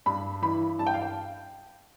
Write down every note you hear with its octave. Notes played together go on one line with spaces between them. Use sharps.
G2 B5
E3 B5
G2 A5
G5
F5
G5